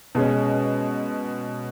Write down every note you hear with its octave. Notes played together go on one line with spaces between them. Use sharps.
B2 G#3 C#4